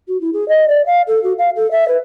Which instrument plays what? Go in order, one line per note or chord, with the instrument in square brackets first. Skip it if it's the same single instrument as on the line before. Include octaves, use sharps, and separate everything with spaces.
[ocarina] F#4
E4
G#4
D#5
D5
F5
A4
F#4
F5
A4
E5
B4